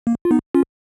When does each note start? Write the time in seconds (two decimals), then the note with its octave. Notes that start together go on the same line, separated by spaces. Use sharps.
0.07 A#3
0.25 F4
0.31 B3 D#4
0.55 C#4 F4